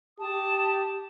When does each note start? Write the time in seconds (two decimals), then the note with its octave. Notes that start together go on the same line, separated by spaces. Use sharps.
0.19 G4 A5 D#6